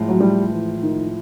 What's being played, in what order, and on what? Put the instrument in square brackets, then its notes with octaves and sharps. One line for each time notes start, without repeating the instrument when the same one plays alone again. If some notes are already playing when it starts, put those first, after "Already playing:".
Already playing: [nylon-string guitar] A2 F3 G#3
[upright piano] F#3
G3
E3
D#3